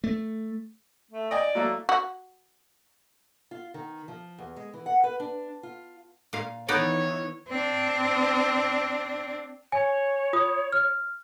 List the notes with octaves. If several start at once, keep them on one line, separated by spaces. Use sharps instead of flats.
A3
A3
D5 D#5 G5 G#5
F#3 A3 A#3
F#4
F4
D#3
F3
E2
G#3
E3
F#5
B4
D4
F4
A#2 F5
D#3 E3 B3 D#4 C#5 D5
C4 D4
C#5 G#5
F4 D#6
F6